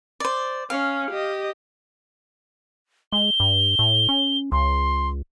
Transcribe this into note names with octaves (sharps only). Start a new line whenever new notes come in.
C5 D5
C#4 F5
G4 D#5
G#3 G7
G2
A2
C#4
C#2 C6